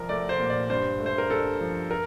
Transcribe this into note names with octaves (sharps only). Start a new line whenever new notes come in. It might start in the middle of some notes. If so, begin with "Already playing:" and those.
Already playing: C2 F3 A#4
A3 D5
C5
A#2
D5
G2 C5
A3
C5
A#4
G2 A4
F3
A#4